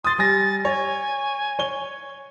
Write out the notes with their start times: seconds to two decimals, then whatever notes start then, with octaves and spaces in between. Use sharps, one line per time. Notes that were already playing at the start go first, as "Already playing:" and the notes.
0.04 C6 D#6 A6
0.18 G3 G#5 A6 A#6
0.65 C#5 G#5
1.59 C#5 G7